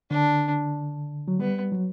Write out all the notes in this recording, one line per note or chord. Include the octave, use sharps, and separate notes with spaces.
D3 D4
F#3
G3 B3
F#3